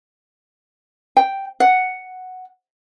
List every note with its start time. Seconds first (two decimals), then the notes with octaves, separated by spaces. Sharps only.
1.17 G5
1.60 F#5